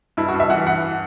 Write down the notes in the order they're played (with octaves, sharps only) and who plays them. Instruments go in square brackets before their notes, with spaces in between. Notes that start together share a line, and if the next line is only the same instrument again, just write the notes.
[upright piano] G2 E4
F#4
G2
E5
E3 F#5
G2 F#5